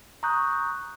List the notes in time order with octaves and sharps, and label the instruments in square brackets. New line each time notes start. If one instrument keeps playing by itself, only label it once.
[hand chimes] A#5 C#6 D#6 F#6 G6